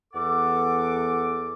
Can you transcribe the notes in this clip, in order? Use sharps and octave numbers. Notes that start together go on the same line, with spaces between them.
E2 A4 F#5 D6